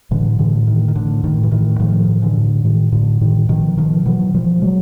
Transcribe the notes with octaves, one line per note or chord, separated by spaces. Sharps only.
A2 D3 E3
A2 D3 E3
A2 D#3
D#3
A2 D3
A2 D#3
E3
A2 D#3
A2 D#3 F3
A2
D3 E3
A2
A2 D#3
A2 D3
A2 D#3
B2 D#3 F3
B2 D#3 F3
B2 E3 F#3
B2 F3 G3
B2 F#3 G#3